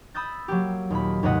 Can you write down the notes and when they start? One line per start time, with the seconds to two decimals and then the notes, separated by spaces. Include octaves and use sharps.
0.14 B5 D#6 E6 G6 A6
0.48 F#3 A#3 G4
0.90 D#2 A#2 B5
1.23 D#2 G#2 C3 B4 D#5 F#5